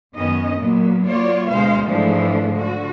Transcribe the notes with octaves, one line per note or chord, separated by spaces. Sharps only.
F#2 D#3 B3 C#4 D#5
A#2 F#3 A#3 B3
F#3 A#3 F4 C#5 D5
D2 B2 G#3 C5 F5
G#2 E3 F3 G#3 A3 D4
D3 F#4